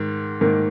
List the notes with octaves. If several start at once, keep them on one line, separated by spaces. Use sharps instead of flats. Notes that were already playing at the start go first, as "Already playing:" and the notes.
Already playing: G#2 D#3
G#2 D#3 A#3